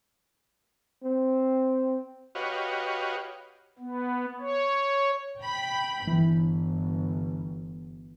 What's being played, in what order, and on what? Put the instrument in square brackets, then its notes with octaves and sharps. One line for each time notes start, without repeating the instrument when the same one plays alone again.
[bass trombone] C4
[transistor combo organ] F#4 G4 B4 C#5 D#5 F5
[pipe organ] B3
C#5
[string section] G5 B5
[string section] G1 [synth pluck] E3